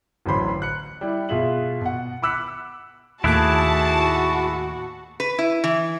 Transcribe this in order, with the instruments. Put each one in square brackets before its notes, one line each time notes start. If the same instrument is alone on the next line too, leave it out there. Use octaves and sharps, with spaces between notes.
[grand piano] D1 A1 F#3 C5 B5 C6
F#6 C#7
G3 E4
B2 F4 G#4 E5 F#7
B2 F#5
B5 D6 E6 F#6 B6 C#7
[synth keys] D#2 A2 D6 [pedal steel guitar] E4 G#4 F#6 [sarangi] F#4 [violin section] A5
[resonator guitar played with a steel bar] B4
E4
E3